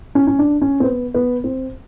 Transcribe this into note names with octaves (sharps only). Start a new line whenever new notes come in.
C#4
C#4
D4
C#4
C4
B3
B3
C4